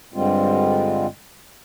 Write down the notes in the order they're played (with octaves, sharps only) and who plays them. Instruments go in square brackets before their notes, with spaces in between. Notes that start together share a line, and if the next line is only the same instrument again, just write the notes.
[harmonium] G2 D3 G3 G#3 C4 F4